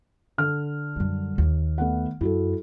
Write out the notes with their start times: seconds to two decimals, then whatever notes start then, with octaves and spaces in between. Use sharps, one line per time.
0.38 D3 F6
0.96 F#2 G3
1.38 D#2
1.78 A3 B3 F#5
2.21 F#2 E4 F#4 A4